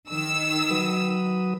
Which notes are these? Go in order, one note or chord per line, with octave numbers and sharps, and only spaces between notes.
D#3 E6
F#3 B4 D#6